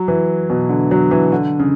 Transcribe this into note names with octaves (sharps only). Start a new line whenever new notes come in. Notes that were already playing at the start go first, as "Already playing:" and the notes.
Already playing: F#3
E3
B2
D3
F#3
E3
D3
C#3